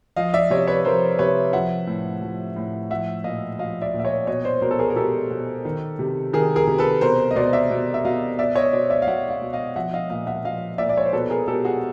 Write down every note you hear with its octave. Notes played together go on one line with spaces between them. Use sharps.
F3 D#5 F5
D5 E5
C3 C#5 D#5
B4 C#5
F3 A#4 C5
C3 B4 C#5
F3 E5 F#5
A2
F3
A2
F3 E5 F#5
A#2 D#5 F5
F3 D#5 F5
D5 E5
A#2
E5
C#5 D#5
B2 C#5 D#5
C5 D5
B2 A#4 C5
A4
G#4 A#4
A#4
B2 G4 A4
B2
D#3
C3
D#3 G#4 A#4
G#4 A#4
C3
A4 B4
B2 A#4 C5
D#5
B2 C5 D5
D5 E5
B2
E5
B2 D#5 F5
B2 D5 E5
C#5 D#5
B2 C5 D5
D5 E5
F5
B2 E5 F#5
D#5 F5
B2
D#5 F5
F3 E5 F#5
D#5 F5
A#2 D#5 F5
E5 F#5
F3 D#5 F5
A#2 D5 E5
D5
C#5
C5
B2 A4 B4
G#4 A#4
B2 G4 A4
F#4 G#4